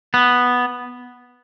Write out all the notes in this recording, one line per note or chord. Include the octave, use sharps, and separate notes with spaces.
B3